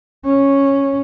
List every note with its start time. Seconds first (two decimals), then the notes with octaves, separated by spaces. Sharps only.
0.25 C#4